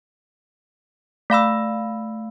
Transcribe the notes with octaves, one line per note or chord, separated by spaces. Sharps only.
A3 F5 B5 E6